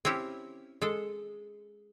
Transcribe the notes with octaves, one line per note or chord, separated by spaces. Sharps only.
C4 C#4 E4 G4
G#3 A4